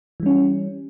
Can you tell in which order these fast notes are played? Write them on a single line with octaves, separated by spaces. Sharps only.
E3 G3 C#4